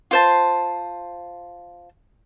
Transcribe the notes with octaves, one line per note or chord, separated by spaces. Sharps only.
F4 C5 A5